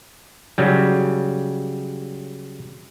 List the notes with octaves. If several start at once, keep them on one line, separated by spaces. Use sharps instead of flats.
C#3 F#3 G3